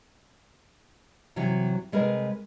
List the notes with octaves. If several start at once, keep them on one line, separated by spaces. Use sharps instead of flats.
C3 E3 F#3
C3 G#3 A#4 B4